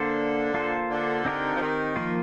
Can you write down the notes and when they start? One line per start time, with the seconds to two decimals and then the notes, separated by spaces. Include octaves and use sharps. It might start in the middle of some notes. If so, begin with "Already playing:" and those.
Already playing: D3 A#3 D4 A4 C5
0.54 A#3 F4 A4 C5
0.90 D3
1.25 C4 D#4 G4 A#4
1.56 F3
1.61 D#3
1.96 F3 A#3 F4